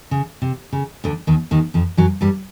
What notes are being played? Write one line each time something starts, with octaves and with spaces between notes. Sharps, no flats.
C#3
C3
C#3
D2 D3
D#2 D#3
D#2 D#3
F2 F3
F#2 F#3
G2 G3